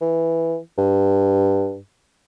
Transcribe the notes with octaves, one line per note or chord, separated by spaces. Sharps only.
E3
G2